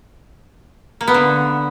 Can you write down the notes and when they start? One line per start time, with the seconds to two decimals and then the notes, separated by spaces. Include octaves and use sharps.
1.01 A#3
1.07 B3
1.14 D3